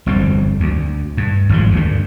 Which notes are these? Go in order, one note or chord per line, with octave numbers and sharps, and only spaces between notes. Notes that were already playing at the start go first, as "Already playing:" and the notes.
G1 F2 G3 C4
D2
G2
G#1 G2 F3
D2 G2